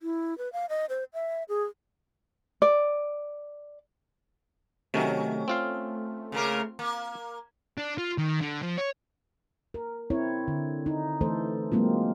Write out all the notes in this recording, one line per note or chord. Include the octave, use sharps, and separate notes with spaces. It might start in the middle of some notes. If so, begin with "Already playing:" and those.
E4
B4
F5
D#5
C5
E5
G#4
D5
C3 D#3 F#3 A3 C#4
C4 F4 F5
C#3 A#3 A#4
A#3
D4
F4
D#3
D3
F3
C#5
A#4
C4 E4 C#5
D3
D#4
E3 A3 A4 C5
F#3 G#3 A#3 C4 F4